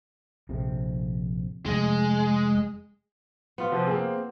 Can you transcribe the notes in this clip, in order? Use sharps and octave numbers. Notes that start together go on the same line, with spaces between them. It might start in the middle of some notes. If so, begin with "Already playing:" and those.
A#1 F2 C3
F1 G#3
B3 F4 F#4
C3 F3
A#3 C4 G#4